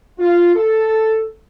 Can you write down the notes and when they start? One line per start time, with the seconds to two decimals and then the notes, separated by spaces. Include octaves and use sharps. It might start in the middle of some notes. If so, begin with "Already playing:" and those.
0.19 F4
0.55 A4